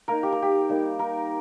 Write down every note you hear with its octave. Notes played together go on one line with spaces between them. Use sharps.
A#3 D#4 A#4
G4
A#4
G4
G3 A#3 D#4
A#4